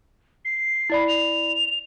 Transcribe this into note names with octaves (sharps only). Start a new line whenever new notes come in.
C7
E4 D5 B5
F7